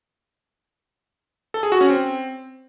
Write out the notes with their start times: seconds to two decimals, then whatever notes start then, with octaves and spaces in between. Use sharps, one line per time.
1.54 A4
1.63 G#4
1.72 F#4
1.81 C#4
1.90 C4